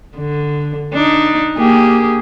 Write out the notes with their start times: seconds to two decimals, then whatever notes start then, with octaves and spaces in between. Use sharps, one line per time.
0.17 D3
0.93 D4 D#4
1.57 A#3 G4 G#4